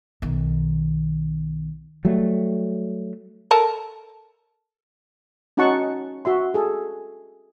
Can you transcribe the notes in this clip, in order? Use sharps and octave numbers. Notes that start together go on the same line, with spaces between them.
B1 D#3
F#3 G3 A3
A4 A#4 A5
C#4 D#4 F#4 F#5 A5 C#6
F#4 E5 C6
G#4 A4